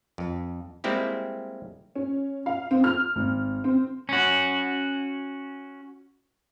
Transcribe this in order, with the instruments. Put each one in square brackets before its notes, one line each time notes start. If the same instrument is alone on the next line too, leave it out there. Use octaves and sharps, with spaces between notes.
[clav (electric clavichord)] F2
G3 G#3 A#3 C4 E4 G4
[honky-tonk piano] C#4
F5
C4
F6
G#1
C4
[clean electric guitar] C#4 F#4